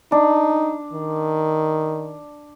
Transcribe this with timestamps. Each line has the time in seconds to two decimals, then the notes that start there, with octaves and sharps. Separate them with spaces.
0.12 D4 D#4
0.93 D#3